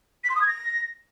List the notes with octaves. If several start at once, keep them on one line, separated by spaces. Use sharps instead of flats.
B6
C6
D#6
G#6
A#6